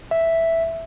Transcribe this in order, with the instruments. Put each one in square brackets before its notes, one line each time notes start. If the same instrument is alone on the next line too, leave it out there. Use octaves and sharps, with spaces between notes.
[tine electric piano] E5